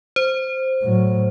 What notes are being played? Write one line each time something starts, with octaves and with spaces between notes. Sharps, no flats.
C5
A2 F#3